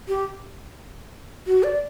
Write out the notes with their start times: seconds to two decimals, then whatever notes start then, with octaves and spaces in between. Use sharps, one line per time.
0.08 G4
1.47 F#4
1.63 D5